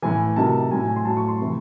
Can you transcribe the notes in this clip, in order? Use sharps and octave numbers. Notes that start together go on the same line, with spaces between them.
A2 E3 G#5
C3 D#3 F#3 A5
A2 F#3 G#5
G#5
C6
A2 F#3 A5
C#6
C6
C3 E3